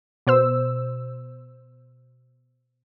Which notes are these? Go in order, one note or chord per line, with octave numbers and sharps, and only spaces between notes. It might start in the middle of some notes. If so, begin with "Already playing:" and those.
B2 C5 E6